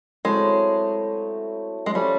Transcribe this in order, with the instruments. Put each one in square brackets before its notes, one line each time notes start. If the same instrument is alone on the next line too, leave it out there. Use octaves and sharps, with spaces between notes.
[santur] F#3 A3 C4 E4 [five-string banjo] G#3
[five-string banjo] G#3
[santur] F3 A3 C#4 F4 [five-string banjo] G3